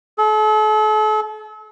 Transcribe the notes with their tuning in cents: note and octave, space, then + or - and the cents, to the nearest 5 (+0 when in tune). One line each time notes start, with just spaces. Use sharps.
A4 -40